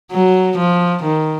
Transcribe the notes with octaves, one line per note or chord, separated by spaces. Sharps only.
F#3
F3
D#3